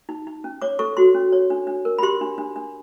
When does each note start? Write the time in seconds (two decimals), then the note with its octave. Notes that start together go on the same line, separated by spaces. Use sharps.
0.09 D#4
0.27 D#4
0.44 C#4
0.62 C#5 D6
0.79 A4 C#6
0.97 F#4 C6
1.14 C#4
1.32 C#5
1.50 D4
1.67 D4
1.85 A#4
1.99 B5
2.03 G4 C6
2.21 D4
2.38 D4
2.56 D4